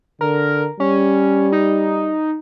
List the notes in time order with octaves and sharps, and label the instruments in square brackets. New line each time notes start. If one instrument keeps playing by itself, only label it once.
[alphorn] D3 [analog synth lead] A#4
[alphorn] G3 [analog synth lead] C#4
[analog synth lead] D#4